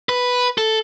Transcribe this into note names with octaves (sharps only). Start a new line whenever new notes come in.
B4
A4